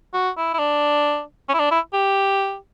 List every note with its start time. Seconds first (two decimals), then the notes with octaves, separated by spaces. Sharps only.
0.14 F#4
0.37 E4
0.54 E4
0.59 D4
1.49 C#4
1.54 E4
1.59 D4
1.71 E4
1.93 G4